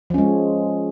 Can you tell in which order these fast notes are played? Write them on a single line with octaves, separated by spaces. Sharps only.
F3 C#4 G#3